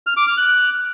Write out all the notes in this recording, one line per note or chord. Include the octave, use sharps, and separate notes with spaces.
F6
D6
F6
F#6